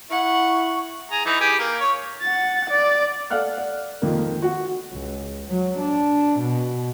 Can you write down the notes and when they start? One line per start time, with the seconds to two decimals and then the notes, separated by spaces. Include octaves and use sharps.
0.10 E4 F#5 C#6
1.11 G#4 A#5
1.25 E3 D#4
1.40 G4 G#4
1.59 A#3
1.80 C#5
2.22 F#5 A6
2.69 D5
3.30 A4 D5 F5 F#5 F6 F#6
3.58 D5
4.02 F2 D#3 A#3
4.42 F#4 F#5
4.93 C#2
5.48 F#3
5.79 D4
6.40 B2